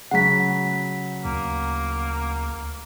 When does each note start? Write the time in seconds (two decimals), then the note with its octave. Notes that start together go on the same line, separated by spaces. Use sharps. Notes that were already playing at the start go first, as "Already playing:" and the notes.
0.11 C#3 F#3 F#5 B6
1.25 D2 A#3